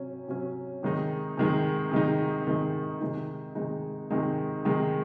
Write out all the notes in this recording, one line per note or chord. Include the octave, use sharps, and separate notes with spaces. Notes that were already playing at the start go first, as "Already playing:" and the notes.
Already playing: C3 F#3 C#4
C3 F#3 C#4
C3 D#3 G#3 D#4
C3 D#3 G#3 D#4
C3 D#3 G#3 D#4
C3 D#3 G#3 D#4
C3 D#3 G#3 D#4
C3 D#3 G#3 D#4
C3 D#3 G#3 D#4
C3 D#3 G#3 D#4